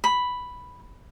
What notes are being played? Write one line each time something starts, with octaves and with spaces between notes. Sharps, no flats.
B5